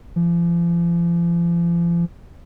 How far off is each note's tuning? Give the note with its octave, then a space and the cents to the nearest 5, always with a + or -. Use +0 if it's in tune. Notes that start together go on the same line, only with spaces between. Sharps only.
F3 -40